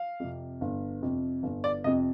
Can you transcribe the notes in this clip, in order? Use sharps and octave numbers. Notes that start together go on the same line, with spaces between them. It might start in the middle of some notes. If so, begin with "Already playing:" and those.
Already playing: F5
F2 C3
G1
F2 C3
G1
D5
F2 C3 D#5